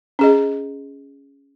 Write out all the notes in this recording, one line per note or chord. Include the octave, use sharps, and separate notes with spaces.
C#4 G#4 D#5